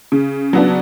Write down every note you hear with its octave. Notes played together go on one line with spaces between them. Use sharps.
C#3
F#3 B3 D4